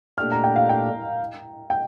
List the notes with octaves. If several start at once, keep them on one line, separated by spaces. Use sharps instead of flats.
A#2 A3 D4 G4 F6
A#5
G5
F5
G5
G5